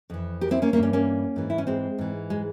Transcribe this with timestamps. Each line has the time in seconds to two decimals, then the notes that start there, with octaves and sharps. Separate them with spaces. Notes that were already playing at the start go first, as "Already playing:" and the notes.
0.10 F2 E3
0.41 G4 A#4
0.51 C4 E4
0.62 A#3 C#4
0.73 E3 A#3 C#4
0.77 G2
0.83 A#3 C#4
0.93 A#3 C#4
1.36 G#2 E3
1.50 E4
1.58 C#4
1.67 G#3 C4
1.98 G#2 E3
2.30 G#3